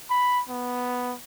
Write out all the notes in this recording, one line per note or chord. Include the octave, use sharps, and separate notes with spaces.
B5
B3